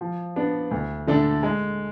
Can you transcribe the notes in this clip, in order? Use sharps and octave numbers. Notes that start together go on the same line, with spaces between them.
F3
B3 D4
D2
D3 A3 D4 A4
G#3